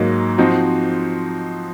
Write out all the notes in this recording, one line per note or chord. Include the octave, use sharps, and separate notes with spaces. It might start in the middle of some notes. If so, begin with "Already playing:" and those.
Already playing: G#2 F#3 A#3 D#4
F3 C4 D#4 F#4